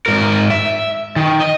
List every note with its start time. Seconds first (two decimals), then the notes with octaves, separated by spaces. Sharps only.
0.06 G#2 A#4
0.51 E5
1.16 D#3
1.40 D#5